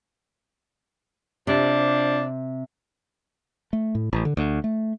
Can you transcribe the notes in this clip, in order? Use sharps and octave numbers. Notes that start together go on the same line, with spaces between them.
C3 F3 D4
A3
A2
A1
D3
D2
A3